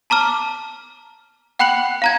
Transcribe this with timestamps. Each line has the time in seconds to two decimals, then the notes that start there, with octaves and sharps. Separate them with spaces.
0.10 A5 A#5 D6 F6
1.59 F#5 G5 B5 F#6 C#7 F#7
2.02 F5 A#5 G#6